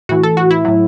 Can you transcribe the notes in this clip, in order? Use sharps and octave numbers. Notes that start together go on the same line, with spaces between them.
A2 E3 F#4
A4
F#4
E4
A2 F#3